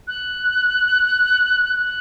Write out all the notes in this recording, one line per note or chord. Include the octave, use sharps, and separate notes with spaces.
F#6
F#6